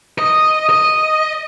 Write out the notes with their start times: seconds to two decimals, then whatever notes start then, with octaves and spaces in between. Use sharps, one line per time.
0.19 D#5
0.70 D#5